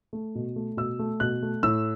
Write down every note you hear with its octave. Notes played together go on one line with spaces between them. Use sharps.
A3
B2
A3
B2 E6
A3
B2 F#6
A3
A2 E6